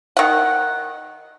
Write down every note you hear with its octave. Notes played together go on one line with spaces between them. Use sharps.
D#3 F#5